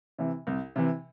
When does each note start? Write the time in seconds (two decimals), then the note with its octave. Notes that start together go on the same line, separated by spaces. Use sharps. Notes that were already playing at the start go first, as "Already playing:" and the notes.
0.19 C3 E3
0.47 C2
0.76 C3 E3